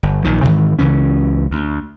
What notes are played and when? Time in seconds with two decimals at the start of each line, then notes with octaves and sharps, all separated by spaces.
0.03 G1
0.24 A#1 A#2 D#3
0.42 G#2 C3 D#3 E3
0.79 C#2 C#3 E3 C#4
1.51 D2